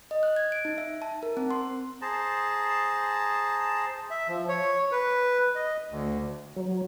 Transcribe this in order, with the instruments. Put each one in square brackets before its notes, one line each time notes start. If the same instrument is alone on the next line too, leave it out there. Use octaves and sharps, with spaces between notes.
[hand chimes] D#5
F#6
G#6
D7
D#4
E5
A5
A#4
C4
C6
[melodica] G#4 C5 A5 A#5
[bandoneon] E5
F3
C#5
B4
D#5
D2
[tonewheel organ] F#3